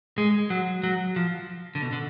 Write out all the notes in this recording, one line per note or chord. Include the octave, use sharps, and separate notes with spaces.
G#3
F#3
F#3
F3
D3
B2
D3